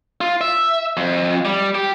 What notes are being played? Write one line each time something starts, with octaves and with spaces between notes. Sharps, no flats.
F4
E5
F2
G3
G4